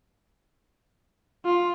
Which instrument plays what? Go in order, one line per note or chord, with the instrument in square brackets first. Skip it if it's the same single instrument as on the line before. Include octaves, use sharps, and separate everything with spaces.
[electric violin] F4